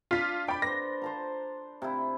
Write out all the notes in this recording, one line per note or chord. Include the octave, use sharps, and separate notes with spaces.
D4 F4 B6
D5 G5 B5
B4 C5 A#6
C5 A5 A#5
C3 E4